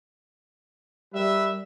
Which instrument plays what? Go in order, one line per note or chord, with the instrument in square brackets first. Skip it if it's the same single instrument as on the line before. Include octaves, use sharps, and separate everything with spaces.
[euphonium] G3 [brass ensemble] A#4 B4 E5